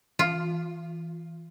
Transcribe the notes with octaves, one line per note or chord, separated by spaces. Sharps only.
E3 F4